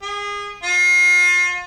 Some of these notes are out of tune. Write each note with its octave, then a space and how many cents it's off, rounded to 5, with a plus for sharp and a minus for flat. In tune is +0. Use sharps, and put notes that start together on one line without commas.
G#4 -25
F4 +35